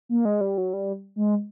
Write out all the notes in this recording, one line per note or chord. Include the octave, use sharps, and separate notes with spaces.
A#3
G#3
G3
F#3
G3
G#3